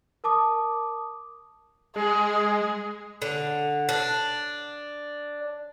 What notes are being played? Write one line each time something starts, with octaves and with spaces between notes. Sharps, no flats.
A#4 A5 D6 D#6
G#3 G#4
D3
D4